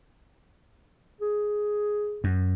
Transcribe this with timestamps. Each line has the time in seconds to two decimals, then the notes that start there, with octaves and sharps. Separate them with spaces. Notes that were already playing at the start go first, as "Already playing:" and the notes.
1.21 G#4
2.24 F#2